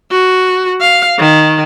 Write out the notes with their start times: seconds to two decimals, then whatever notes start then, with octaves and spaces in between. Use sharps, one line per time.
0.11 F#4
0.81 F5
1.19 D#3